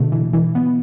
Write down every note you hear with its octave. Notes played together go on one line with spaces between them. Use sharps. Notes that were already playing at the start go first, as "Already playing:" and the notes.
Already playing: B2 D3 A3
E3
E3
B3